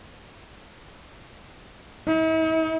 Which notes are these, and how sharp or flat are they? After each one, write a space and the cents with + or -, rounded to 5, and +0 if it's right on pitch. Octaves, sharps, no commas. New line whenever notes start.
E4 -45